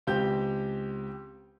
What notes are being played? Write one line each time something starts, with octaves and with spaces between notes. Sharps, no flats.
C#2 C4 G4 G6